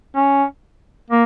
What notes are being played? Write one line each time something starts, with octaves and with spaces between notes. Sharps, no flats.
C#4
A#3